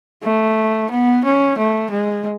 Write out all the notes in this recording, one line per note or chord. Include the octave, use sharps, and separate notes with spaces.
A3
B3
C#4
A3
G#3